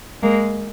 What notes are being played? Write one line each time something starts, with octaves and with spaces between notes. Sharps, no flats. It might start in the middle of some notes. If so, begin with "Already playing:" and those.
G#3 A#3